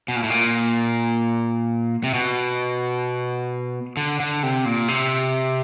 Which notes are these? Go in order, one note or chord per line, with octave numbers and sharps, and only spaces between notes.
B2
A#2
A2
A#2
C3
B2
D3
D3
C3
A#2
C3